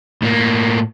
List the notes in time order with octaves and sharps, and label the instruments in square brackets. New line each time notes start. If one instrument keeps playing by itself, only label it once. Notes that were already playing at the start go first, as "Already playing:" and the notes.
[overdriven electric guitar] A2 A#3